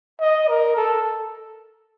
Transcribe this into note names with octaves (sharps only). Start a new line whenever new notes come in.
D#5
A#4
A4